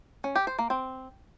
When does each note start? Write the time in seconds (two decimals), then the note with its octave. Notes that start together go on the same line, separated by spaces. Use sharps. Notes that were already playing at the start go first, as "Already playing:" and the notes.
0.24 C#4
0.36 G4
0.47 C5
0.59 A#3
0.70 C4